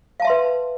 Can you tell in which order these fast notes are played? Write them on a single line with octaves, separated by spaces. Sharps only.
F5 A5 E5 C6 B4